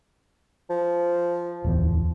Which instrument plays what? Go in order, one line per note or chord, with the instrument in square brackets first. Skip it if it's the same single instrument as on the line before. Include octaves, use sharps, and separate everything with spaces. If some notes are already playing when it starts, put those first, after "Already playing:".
[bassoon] F3
[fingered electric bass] D1 E2